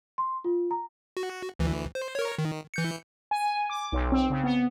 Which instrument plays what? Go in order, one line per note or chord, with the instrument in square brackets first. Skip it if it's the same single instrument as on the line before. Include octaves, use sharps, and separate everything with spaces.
[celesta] C6
F4
A#5
[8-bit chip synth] F#4
D2 E3
C5
A#4 C#5
D#3
E3 G6 C#7
[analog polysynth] G#5
D6
B1
C4
C#3
B3